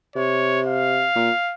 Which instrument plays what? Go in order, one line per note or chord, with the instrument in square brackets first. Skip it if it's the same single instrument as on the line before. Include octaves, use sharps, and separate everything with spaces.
[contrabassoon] C3 [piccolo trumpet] C#5
[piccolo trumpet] F5
[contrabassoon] A#2